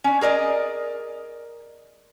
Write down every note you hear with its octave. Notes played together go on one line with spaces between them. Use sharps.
C#4 D4
G#4 A#4 D5 D#5